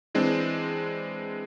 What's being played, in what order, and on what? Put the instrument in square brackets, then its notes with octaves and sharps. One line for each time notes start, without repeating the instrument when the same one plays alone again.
[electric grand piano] E3 G#3 C4 D4